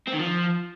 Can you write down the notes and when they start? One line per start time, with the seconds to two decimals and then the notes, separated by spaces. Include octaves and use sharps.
0.08 C4
0.14 D#3
0.20 F3